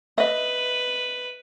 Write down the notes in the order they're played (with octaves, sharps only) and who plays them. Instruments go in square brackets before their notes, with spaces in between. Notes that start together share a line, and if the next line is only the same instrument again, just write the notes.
[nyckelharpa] B4 [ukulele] D#5 E5